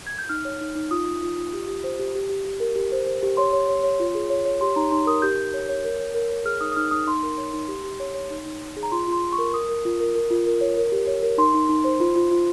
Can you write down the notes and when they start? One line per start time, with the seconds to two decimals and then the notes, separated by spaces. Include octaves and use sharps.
0.07 G#6
0.19 G6
0.29 D#4 F6
0.45 C#5
0.61 D#4
0.75 D#4
0.91 F4 D#6
1.07 F4
1.23 F4
1.37 F4
1.53 G4
1.68 G4
1.84 C5
2.00 G4
2.15 G4
2.29 G4
2.45 G4
2.60 A#4
2.76 G4
2.92 C5
3.07 C5
3.23 G4
3.37 C#5 C6
3.53 C#5
3.69 C#5
3.83 C#5
4.00 F4
4.15 G#4
4.30 C#5
4.45 C#5
4.61 G4 C6
4.76 D#4 A#5
4.91 D#4 C6
5.06 A#4 D#6
5.22 G4 G6
5.38 G4
5.54 C#5
5.69 C#5
5.84 A#4
5.99 C#5
6.14 A#4
6.31 C#5
6.45 G#4 F6
6.61 D#4 D#6
6.72 D#6
6.77 D#4 F6
6.91 D#4 D#6
7.07 D#4 C6
7.23 A#4
7.38 C#5
7.54 D#4
7.68 G4
7.84 G4
8.00 C#5
8.14 C#5
8.30 D#4
8.46 D#4
8.61 D#4
8.76 G#4
8.83 A#5
8.92 F4 C6
9.07 F4
9.12 C6
9.23 F4
9.33 C#6
9.38 A#4
9.53 A#4 D#6
9.69 A#4
9.85 F4
10.00 A#4
10.15 A#4
10.31 F4
10.47 A#4
10.61 C#5
10.77 A#4
10.92 G4
11.07 C#5
11.23 A#4
11.38 D#4 C6
11.54 D#4
11.69 D#4
11.84 C5
12.00 F4
12.16 F4
12.31 F4